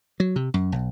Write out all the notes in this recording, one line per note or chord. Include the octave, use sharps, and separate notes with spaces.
F#3
C3
F#2
B1